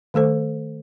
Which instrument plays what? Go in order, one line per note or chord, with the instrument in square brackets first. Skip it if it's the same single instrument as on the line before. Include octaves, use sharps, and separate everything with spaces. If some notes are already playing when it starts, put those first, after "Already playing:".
[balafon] D#3 A3 A4 C5